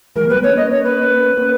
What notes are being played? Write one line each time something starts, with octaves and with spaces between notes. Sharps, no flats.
E3 G#3 A#4
G3 A#3
B4
G#3 B3
A#3 C#4 C#5
A#3 C#4 D#5
C#5
B4
A#3 C#4